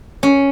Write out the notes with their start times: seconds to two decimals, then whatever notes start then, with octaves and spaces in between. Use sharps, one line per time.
0.23 C#4